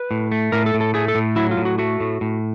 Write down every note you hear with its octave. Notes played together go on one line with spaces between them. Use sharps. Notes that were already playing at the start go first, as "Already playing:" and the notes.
Already playing: B4
A2
A3
A2 A#4
A4
A2
A4
A3 G#4
A4
A2
F#3 E4
F4
A2
F#4
A3 F#4
A2
A2